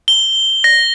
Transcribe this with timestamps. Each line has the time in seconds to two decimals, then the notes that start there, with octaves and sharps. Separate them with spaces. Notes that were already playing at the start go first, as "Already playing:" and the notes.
0.08 G7
0.64 A#6